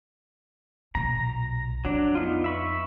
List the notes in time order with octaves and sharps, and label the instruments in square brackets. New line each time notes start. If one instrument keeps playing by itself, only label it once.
[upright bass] B1 A#2 [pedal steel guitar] A#5
[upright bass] F2 [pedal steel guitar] F#3 D4
[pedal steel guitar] B3 D#4 F4
E5 B5 C#6